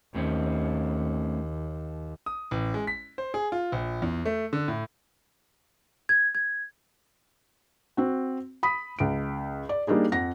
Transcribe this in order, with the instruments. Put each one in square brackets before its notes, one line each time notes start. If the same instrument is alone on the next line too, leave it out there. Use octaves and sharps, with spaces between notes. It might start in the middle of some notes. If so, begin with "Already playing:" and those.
[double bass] D#2 [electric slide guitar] A2 C4 C#4
[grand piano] D#6
A1
G#3
B6
C5
G#4
F4
A#1
E2
A3
D3
A2
[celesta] G#6
G#6
[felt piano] C4 F#4
B5 D#6 B6
C#2 D7
D5
G3 A#3 D4 D#4 G#4
F2 F#5 A#6